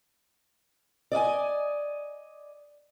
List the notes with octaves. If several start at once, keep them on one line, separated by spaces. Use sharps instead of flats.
D5 D#5 F5 G#5